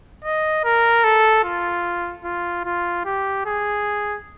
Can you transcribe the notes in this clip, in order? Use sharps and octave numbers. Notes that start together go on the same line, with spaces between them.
D#5
A#4
A4
F4
F4
F4
G4
G#4